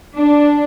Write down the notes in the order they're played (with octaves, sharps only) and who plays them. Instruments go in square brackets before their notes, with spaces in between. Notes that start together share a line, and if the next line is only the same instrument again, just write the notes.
[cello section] D4